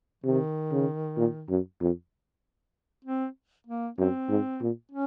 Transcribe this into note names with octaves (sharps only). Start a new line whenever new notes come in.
C3 D#3
C#3
A#2
F#2
F2
C4
A#3
F#2 C4
G#2
A#2
C#4